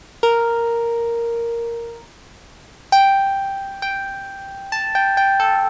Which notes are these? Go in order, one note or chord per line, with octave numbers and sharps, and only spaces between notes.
A#4
G5
G5
A5
G5
G5
A4